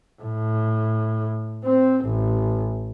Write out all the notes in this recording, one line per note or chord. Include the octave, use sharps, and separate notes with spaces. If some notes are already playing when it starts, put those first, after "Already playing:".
A2
C4
A1